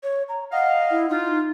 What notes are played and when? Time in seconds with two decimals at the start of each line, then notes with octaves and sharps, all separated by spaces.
0.03 C#5
0.29 A#5
0.52 D#5 F5 F#5
0.91 E4
1.10 D#4 F4